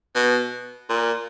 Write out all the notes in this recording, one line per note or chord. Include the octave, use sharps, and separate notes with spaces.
B2
A#2